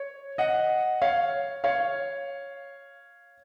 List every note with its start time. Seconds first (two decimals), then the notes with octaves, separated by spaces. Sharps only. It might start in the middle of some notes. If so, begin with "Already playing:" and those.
Already playing: C#5
0.38 D#5 F#5
1.02 C#5 F5
1.64 C#5 F5